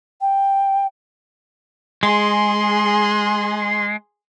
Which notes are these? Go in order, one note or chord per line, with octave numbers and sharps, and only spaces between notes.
G5
G#3 G#4 C6